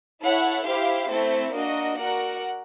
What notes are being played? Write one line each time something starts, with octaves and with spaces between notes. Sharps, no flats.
E4 A4 C#5 F#5
E4 G4 C5 F5
A3 C4 E4 A4 C5
A#3 D4 F#4 A#4 D#5
F#4 A#4 D5 F#5